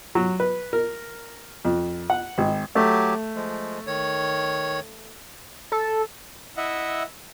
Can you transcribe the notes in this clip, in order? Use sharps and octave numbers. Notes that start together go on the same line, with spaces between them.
F#3
B4
A#4
F2
F#5
G#1
F#3 A3 G4
F3 G#3
D#3 C#5
A4
E4 D#5 E5 F#5